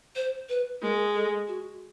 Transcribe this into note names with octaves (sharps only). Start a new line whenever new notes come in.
C5
B4
G#3 A#4
A4
F#4